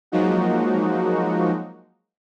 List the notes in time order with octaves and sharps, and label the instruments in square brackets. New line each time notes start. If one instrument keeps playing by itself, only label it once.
[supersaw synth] F3 F#3 G#3 A#3 D#4 F#4